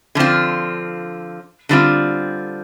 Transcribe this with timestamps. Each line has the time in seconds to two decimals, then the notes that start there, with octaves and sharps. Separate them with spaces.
0.15 D3 F3 C4 F4
1.69 D3 G3 C4 F4